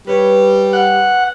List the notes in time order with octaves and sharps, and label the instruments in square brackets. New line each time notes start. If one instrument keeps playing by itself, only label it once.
[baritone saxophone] G3 [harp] B4 C#5
[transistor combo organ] F#5